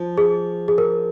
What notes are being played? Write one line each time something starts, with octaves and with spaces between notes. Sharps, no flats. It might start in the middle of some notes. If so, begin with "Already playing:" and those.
Already playing: F3
G#4
G#4
A#4